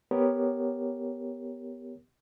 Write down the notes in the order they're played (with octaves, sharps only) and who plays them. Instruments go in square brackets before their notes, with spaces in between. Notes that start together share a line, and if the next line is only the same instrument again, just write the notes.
[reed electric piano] B3 G4 A#4 C#5